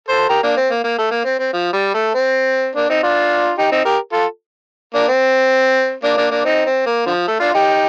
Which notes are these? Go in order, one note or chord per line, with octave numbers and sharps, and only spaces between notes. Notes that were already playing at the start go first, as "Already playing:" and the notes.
A4 C5
G4 A#4
A#3 D4
C4
A#3
A#3
A3
A#3
C4
C4
F3
G3
A3
C4
A#3 D4
C4 D#4
D4 F4
D#4 G4
C4 D#4
G4 A#4
F4 A4
A#3 D4
C4
A#3 D4
A#3 D4
A#3 D4
C4 D#4
C4
A#3
D3 F3
A3
D4 F4
D#4 G4